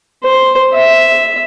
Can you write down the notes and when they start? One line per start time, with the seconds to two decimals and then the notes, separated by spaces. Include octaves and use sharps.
0.24 C5
0.75 E5